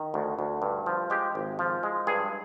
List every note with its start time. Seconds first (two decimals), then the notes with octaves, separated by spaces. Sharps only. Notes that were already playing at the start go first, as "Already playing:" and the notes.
Already playing: D#3
0.14 D2
0.39 D2
0.62 G2
0.86 F3
1.10 G#3 G4
1.35 G#1
1.59 F3
1.83 G#3
2.07 G2 G#4